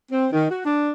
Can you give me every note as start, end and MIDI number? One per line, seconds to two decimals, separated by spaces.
0.12 0.28 60
0.33 0.48 51
0.50 0.63 66
0.65 0.91 62